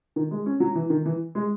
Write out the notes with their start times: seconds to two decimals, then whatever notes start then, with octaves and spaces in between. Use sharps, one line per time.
0.16 D#3
0.31 G#3
0.46 C#4
0.60 F#3
0.75 E3
0.90 D#3
1.05 E3
1.35 G#3